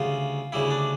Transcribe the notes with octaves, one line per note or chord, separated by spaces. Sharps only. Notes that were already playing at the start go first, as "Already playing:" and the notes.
Already playing: D2 C#3 G3 F4
D2 C#3 G3 E4
D4